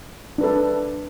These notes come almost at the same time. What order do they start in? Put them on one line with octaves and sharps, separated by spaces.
D4 B4 A4